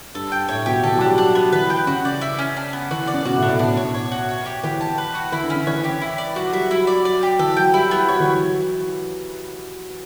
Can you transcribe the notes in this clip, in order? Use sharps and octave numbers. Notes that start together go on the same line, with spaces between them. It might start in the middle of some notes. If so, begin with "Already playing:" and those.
G2 A4
G5
A2 C#5
B2 G4
E3 A4
F#3
D4
G3
F#3 D4
B3
E3 B4
G5
C#3 F#4
D5
E4
C#4
D4
B3
E3 F#4
D5
C#3
B2 F#4
A2
D4
A2
B2 D4
C#5
C#5
F#4
C#5
G4
E3 G4
A5
B4
F#4
E3 E4
D3
C#4
C#3
E3 C#5
G4
E4
D5
F#3 F#4
G3 E5
F#3 E4
D5
D5
G4
E3 A4
F#3 G5
G3 E4
B3
F#3 C#5
E3